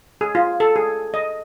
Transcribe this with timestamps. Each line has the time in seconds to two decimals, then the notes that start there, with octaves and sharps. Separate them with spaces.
0.21 G#4
0.35 F4
0.60 A4
0.76 G#4
1.14 D#5